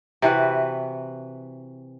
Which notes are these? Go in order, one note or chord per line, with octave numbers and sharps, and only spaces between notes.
C3 E3 F#4 B4